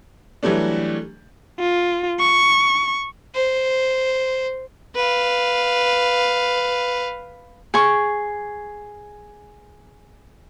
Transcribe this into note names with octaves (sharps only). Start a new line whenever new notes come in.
E3 F#3 G3 A3 D4
F4
C#6
C5
B4 F5
G#4 C#6